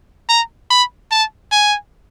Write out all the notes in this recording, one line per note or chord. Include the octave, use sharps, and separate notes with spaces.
A#5
B5
A5
G#5